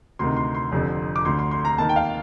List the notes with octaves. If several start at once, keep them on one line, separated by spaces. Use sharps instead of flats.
D2 C3 D#3 C6
C6
C6
F1 F2 D3
D6
D2 D3 C6
C6
C6
A#5
D#2 D#3 A5
G5
F5